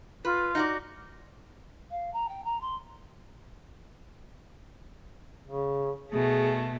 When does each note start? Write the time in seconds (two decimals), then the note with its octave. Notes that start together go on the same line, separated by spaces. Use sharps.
0.25 F4 B4
0.55 D#4 F#4 D5
1.90 F5
2.13 A#5
2.28 G5
2.44 A#5
2.61 C6
5.45 C#3
6.11 B2 A3 G#4